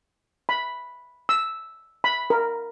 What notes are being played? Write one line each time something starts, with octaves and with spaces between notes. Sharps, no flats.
B5
E6
B5
A#4